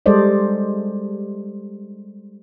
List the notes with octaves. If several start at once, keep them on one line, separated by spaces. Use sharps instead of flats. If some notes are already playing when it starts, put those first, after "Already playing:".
G3 G#3 A4 C5 D5 D#5